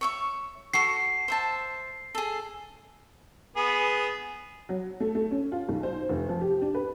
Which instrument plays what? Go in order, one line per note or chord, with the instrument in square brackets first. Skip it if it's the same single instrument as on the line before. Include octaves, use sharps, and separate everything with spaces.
[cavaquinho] C#5 E5 C#6
[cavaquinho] F#4 A4 C#6 [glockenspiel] C7
[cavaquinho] C5 E5 A5
G#4 A4
[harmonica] B3 G#4
[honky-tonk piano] F#3
A3
A3
C#4
F4
B1
C5
F1
F3
G4
D4
B4